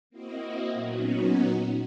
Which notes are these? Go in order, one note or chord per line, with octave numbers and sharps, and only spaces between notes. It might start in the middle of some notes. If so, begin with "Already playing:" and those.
A#3 C4 E4 F#4 D#5
A#2 F#3 B3 C#4 D#4 F#4